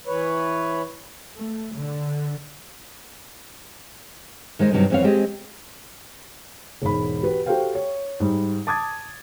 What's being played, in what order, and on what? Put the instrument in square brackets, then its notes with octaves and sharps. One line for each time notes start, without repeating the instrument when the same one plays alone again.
[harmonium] E3 B4 C#5
[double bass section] A3
D3
[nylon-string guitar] D#3 G#3 C5 D#5
G2 C3 D#3 F#3 G3
F2 E3 C4 C#5 F5
G#3 C4 G4 G#4 D#5
[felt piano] E1 G#2 B5
F#4 G4 B4
F#4 G4 A4 C5 F5 G5
C#5
G#2 G3
A5 D6 D#6 G#6 A6